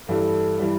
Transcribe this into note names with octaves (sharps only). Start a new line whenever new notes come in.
G2 E3 G3 A4
E3 G3